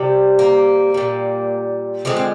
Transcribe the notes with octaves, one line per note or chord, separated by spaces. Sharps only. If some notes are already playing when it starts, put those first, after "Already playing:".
Already playing: C3 G3
A#3
A#2 G3
D3 F3 G#3 C4
C4